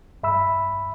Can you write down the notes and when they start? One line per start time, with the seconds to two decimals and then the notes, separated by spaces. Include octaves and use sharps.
0.23 G2 E5 B5 E6